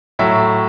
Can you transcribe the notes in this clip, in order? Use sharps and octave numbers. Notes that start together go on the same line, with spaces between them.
A2 F#3 E5